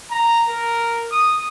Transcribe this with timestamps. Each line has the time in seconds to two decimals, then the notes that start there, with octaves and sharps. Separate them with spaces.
0.10 A#5
0.49 A#4
1.11 D#6